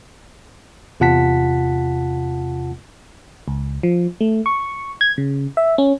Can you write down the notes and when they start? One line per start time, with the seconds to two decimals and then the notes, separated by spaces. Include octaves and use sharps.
1.00 E2 C3 F4 F#5 A5 B6
3.48 C#2
3.83 F3
4.21 A3
4.46 C#6
5.01 G#6
5.18 C#3
5.57 E5
5.78 C#4